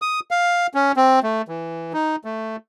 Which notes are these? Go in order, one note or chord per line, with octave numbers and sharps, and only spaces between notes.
D#6
F5
C#4
C4
A3
E3
D#4
A3